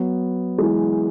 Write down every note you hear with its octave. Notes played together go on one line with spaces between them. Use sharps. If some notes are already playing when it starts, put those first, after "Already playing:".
Already playing: F#3 B3
E3 G#3